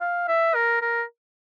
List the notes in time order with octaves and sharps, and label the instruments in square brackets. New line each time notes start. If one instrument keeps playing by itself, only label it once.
[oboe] F5
E5
A#4
A#4